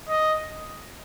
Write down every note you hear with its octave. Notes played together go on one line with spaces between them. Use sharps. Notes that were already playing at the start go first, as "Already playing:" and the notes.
D#5